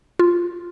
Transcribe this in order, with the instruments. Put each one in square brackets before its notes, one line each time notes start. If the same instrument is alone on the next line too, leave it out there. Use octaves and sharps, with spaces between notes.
[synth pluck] F4